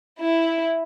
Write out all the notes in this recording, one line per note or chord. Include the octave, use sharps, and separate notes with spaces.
E4